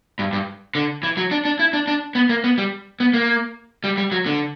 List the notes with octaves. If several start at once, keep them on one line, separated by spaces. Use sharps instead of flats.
G2
G2
D3
E3
F#3
D4
D4
E4
D4
D4
B3
A#3
B3
G3
B3
A#3
G3
G3
F#3
D3